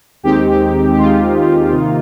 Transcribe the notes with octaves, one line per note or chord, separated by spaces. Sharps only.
D#2 D#3 G#3 C4 D#4 G4
G4
D#2 D#3 G#3 C4 D#4 F4
C3 D#3 A#3 D#4